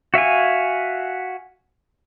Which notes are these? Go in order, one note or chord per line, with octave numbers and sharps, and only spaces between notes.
F#4 E5 F5 G#5